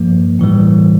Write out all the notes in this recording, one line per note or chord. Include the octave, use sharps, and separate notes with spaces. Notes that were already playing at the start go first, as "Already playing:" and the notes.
Already playing: G2 F3 A#3
A2 E3 G3